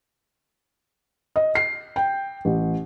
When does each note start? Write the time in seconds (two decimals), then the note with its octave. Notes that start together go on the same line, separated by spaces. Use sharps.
1.36 D#5
1.55 C7
1.96 G5
2.45 A1